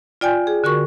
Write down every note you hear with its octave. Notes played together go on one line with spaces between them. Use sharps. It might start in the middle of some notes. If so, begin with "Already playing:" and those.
F4 D5 G5 G#5 G6
G#4
D3 F#4 A#4 C#6